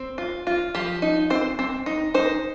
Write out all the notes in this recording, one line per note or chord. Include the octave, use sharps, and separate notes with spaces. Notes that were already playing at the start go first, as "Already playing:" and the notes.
Already playing: C4
F4
F4
F3 G4
D#4
C4 C5
C4
D#4
D#4 C5